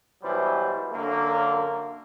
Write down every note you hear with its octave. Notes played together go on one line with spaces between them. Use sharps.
B2 E3 F#3 G3 C5
F#2 D3 A#3